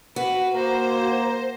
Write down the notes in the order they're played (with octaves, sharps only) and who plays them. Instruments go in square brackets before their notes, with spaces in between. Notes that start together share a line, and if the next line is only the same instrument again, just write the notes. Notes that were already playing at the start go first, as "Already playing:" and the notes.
[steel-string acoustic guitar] F#4 [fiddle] B4
[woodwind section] A#3 A#5 [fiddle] C5